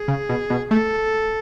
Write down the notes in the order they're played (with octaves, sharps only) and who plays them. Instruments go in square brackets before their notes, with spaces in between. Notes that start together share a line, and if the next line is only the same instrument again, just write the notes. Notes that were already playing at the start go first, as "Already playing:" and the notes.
Already playing: [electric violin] G#4
[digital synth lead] C#3
B2
B2
[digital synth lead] A3 [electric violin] A4